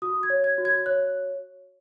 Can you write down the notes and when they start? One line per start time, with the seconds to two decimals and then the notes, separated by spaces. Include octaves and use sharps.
0.02 F#4 D#6
0.23 G#6
0.30 C#5
0.44 G#6
0.58 F#4
0.65 G#6
0.86 C#5 F#6